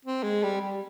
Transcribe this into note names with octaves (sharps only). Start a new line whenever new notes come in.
C4
G#3
G3
G3